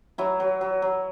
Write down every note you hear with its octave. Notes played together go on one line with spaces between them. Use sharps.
F#3 E4
F#3
F#3
F#3